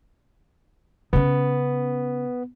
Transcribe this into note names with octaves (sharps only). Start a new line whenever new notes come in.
C#3 B3 C#4